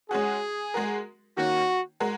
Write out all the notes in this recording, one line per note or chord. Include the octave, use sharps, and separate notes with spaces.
G#3 C#4 F#4 G#4
G#3 F#4 A#4
D#3 A#3 C#4 F#4
G#3 F#4 A#4